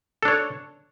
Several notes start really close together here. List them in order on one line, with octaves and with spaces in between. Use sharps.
A4 D4 C#5